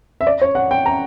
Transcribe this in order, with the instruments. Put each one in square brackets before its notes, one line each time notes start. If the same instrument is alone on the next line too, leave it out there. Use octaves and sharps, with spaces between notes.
[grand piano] E5
D5
C#5
F#5
G5
A#5